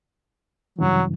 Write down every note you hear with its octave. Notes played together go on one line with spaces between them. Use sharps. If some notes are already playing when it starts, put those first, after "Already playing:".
G2 C#3 E3 F#3